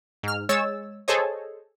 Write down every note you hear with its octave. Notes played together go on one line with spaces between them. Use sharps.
G#2 F6
G#3 C#5 E6 A6
G#4 A4 C5 C#5 D#5